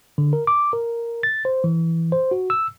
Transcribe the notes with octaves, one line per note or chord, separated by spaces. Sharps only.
D3
A#4
D6
A#4
A6
C5
E3
C5
F#4
E6